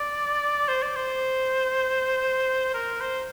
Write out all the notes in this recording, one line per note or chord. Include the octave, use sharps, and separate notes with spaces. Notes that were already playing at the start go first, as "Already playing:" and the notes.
Already playing: D5
C5
D5
C5
A#4
C5